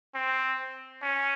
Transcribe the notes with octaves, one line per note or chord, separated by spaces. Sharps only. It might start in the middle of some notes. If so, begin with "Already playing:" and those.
C4
C#4